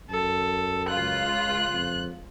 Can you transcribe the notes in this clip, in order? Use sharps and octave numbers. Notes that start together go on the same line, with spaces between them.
F#2 A4
C#2 F4 F#6
F2